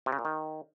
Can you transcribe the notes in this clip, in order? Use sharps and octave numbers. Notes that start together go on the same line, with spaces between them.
C3
C#3
A#2
D#3